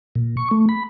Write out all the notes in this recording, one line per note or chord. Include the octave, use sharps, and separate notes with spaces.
A#2
C#6
A3
B5